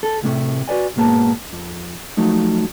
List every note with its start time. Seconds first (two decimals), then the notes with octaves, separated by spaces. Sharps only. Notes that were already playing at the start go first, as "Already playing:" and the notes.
0.03 A4
0.22 C2 A2 C3 A3
0.68 F#4 B4 D5 G#5
0.96 B1 G#2 A#3 B3 A5
1.53 F2
2.17 F3 F#3 A3 D#4